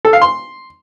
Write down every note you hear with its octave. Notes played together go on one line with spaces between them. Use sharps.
A4
F5
C6